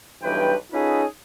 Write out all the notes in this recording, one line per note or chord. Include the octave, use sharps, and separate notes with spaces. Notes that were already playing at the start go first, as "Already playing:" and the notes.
B1 G2 E3 B4 G5
C#4 D#4 F4 G#4 A4 B4